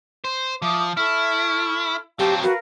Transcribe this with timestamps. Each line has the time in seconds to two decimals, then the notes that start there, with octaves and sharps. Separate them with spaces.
0.24 C5
0.62 F3 E5 D6 D#6
0.97 E4 A4 C#6 F6
2.19 F#3 C4 G4 F5 A5
2.43 F#4 A#4 B4 F5